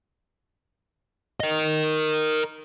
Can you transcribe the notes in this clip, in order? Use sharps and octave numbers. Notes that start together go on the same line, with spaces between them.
A#4 D#5